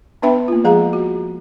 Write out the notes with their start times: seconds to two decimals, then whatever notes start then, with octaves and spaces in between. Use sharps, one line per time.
0.22 B3 D4 B4 E5 G5 B5
0.48 A#3 F4
0.64 F3 G#3 G#4 F5 A#5
0.93 F#4